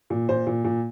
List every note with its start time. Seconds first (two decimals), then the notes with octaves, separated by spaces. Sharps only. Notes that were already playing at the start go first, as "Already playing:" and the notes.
0.10 A#2
0.29 A#2 C5
0.47 A#2
0.64 A#2